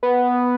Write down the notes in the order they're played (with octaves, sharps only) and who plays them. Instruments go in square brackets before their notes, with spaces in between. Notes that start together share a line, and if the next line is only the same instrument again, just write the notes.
[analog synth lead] B3